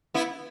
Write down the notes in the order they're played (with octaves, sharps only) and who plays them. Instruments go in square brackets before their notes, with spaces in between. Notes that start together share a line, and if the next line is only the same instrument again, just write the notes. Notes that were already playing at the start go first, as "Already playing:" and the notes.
[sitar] B3 E4